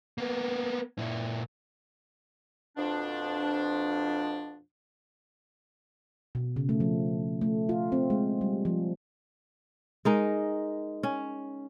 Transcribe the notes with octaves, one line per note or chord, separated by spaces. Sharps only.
A#3 B3
A#2 E4
F2 B2 F3 D4
B2
C#3
A3
F3
A3
F4
C4
G#3
G3
F3
G#3 D#4 A#4
C#4